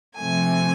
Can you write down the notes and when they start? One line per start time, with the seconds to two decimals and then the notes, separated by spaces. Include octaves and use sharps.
0.16 C3 F3 A3 G#5